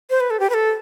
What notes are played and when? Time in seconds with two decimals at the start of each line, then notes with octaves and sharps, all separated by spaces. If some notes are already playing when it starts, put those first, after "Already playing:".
0.10 C5
0.20 B4
0.30 A4
0.40 G4
0.50 B4
0.54 A4